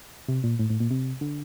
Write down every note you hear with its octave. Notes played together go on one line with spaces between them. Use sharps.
C3
A#2
A2
A2
A#2
C3
D3